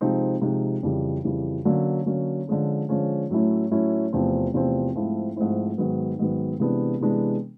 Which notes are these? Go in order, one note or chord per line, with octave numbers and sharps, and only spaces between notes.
C3 F3 G#3 C4 D#4
C3 F3 G#3 C4 D#4
F2 C#3 E3 G3
F2 C#3 E3 G3
D3 F#3 A#3 C#4
D3 F#3 A#3 C#4
D3 F3 G#3 C#4
D3 F3 G#3 C#4
A2 F#3 A3 C#4 E4
A2 F#3 A3 C#4 E4
E2 C3 F3 A3 C4
E2 C3 F3 A3 C4
G#2 F3 A3 C4 E4
G#2 F3 A3 C4 E4
G#2 D#3 F#3 B3
G#2 D#3 F#3 B3
C3 E3 G#3 B3 D4
C3 E3 G#3 B3 D4